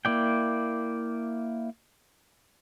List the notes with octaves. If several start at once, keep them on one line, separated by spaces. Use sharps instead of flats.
A#3 E4 D5 G5